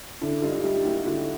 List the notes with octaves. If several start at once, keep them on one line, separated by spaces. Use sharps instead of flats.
D3 D4 E4
G2 D#4 F4
G3 F4 G4
A#3 E4 F#4
D3 E4 F#4